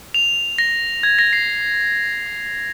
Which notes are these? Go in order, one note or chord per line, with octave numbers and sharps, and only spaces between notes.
F7
A#6
G#6
A#6
C7